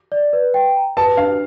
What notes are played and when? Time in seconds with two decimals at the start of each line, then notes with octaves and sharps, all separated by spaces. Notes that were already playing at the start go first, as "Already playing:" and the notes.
0.12 D5
0.33 B4
0.54 G5
0.76 A#5
0.97 B4 A5
1.17 D4 F5